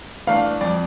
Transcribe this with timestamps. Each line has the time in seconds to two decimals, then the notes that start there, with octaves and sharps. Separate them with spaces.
0.27 E3 A3 D4 F5
0.61 F2 D5